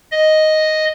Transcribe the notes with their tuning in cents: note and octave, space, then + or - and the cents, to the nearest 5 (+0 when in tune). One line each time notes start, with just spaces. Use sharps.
D#5 +0